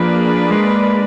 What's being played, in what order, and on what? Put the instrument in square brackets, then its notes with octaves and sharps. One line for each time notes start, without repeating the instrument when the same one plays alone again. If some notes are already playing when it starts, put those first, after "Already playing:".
Already playing: [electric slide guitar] F3 [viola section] A#3 D4 G#4 B4 D5
[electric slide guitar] G#3